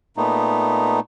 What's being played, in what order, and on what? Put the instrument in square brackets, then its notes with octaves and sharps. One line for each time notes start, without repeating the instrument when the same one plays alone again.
[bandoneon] A#2 A3 B3 D#4